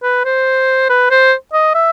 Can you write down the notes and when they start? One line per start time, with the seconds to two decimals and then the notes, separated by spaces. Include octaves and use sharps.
0.03 B4
0.25 C5
0.89 B4
1.10 C5
1.53 D#5
1.75 E5